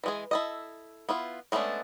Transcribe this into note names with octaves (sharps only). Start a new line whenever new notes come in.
E3 G#3 G#4
E4 A4 D#5
B3 E4 F4
G#3 A3 B3 C#4 D4